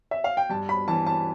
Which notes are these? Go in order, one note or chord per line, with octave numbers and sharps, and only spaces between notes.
E5
F5
G5
G2 A5
B5
E3 A5
A5